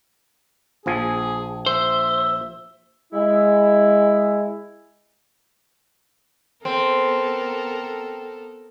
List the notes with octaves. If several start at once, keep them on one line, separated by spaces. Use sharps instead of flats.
A#1 F3 G#4 G#5
C5 E5
G#3 E4
B3 C4 A4 A#4